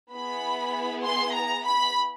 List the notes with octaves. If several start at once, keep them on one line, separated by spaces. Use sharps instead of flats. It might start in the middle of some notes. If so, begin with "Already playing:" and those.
B3 E4 G#4 B5
C6
A#5
B5